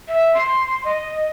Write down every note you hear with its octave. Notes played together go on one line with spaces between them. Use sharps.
E5
C6
D#5